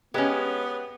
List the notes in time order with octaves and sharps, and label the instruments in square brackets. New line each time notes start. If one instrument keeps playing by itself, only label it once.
[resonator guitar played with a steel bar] G#3 C#4 [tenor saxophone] B3 [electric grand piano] G4 B4 D#5